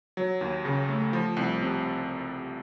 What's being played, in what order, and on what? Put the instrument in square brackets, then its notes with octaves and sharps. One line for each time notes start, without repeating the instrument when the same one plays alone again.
[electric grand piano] F#3
D#2
C#3
A3
F3
C2
C3